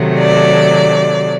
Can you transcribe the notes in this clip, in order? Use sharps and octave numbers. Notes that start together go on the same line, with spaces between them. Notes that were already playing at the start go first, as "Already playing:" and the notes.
Already playing: C3 D#3 F#3 A3
D5